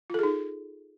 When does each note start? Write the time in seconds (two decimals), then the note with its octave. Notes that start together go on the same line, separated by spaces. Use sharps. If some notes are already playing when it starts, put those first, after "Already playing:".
0.10 F4
0.14 A4
0.19 G#4
0.23 D#4